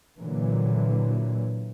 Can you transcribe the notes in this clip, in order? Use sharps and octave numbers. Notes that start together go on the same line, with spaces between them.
A#2 D3 E3 F#3